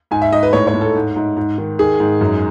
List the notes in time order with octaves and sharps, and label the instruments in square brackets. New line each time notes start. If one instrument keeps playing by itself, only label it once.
[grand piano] G#2 G#5
E5
G#2 D#5
B4
A2 C#5
C#5
A2
A4
G#2
G#2
G#2
D#3
D#3 G#4
G#2
F#2